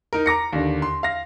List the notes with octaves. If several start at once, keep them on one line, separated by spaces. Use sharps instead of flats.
D#4 A#4
A#5 D6 A#6 C#7
D#2 D3
C6
F5 A#6